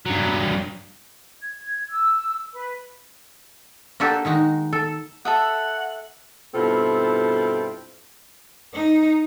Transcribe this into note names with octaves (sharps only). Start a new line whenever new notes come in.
G2 F#3
G#6
E6
B4
A#3 D4 F#4 G4 A4
D#3 G#3 D#4 F#4
A4
A4 E5 F#5 D#6
G2 B2 C4 E4 F4 A4
D#4